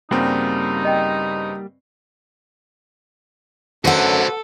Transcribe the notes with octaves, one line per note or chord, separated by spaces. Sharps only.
G2 C#3 G3 A#3 C4 D#4 F#4
D#5 G5
F#2 D3 F#4 A4 B4 C5 F#5